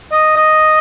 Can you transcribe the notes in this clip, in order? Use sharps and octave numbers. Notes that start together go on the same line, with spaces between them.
D#5
D#5